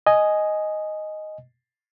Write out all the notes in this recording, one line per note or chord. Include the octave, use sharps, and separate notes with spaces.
D#5 G#5